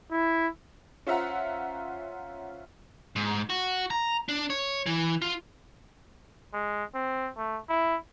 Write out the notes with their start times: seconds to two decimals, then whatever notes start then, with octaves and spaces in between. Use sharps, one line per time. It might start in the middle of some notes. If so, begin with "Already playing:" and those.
0.11 E4
1.07 C#4 F4 C5 E5 F#5 A#5
3.16 G#2
3.50 F#4
3.90 A#5
4.29 D4
4.50 C#5
4.86 E3
5.22 F4
6.54 G#3
6.95 C4
7.37 A3
7.69 E4